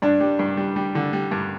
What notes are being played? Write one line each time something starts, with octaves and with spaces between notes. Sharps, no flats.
G2 D4
G3
G2
G3
G3
D3
G3
G2